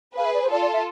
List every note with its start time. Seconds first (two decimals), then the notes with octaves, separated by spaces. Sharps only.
0.17 G#4 B4 F5
0.25 E5
0.34 D5
0.42 C5
0.51 F4 A4 D5
0.62 D5
0.73 E5